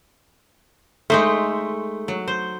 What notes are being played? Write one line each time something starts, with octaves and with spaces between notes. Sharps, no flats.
G#3 A3 D#4 C5
F#3
C5